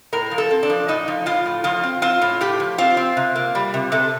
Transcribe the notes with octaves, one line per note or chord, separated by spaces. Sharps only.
A2 A#4
F3
A4
C4
D4
F3
A2 D#4
F3
A2 F4
A2
F3 F4
C4
C4 F4
A2
A2 G4
F3
C4 F4
C4
C3
A#3
G3
C3
C3 A4